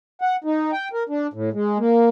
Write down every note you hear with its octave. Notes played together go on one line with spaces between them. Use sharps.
F#5
D#4
G5
A#4
D4
A2
G#3
A#3